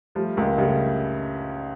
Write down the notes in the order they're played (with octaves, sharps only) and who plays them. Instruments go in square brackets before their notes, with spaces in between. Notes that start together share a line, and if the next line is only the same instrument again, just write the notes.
[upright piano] F3 [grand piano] G3 A3
[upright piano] C#2 [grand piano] G#3 A#3
[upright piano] C#3 [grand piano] G3 A3